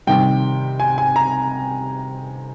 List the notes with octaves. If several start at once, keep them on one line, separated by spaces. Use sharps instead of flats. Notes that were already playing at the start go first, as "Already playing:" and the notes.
C3 D#3 G3 G5
G#5
G#5
A#5